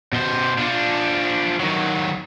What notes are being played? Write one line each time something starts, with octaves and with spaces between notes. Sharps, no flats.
B2 C5
F3 D4
D#3 F#3